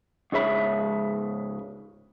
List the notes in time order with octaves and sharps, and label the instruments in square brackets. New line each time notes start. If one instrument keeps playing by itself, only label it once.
[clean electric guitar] C#2 G#2 G#3 C#5 E5 B5